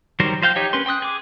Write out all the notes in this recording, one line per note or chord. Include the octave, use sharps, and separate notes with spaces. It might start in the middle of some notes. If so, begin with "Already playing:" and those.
D#3 F#3 G3 A#4 C5
F3 C5 F5 G5 G6
D#4 G4 C#5 G5
C#4 A#4 B4 C6
G5 C6 D#6 F#6
G#4 D6